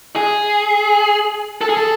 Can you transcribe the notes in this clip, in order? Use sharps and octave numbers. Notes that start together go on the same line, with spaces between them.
G#4
A4
G#4
A4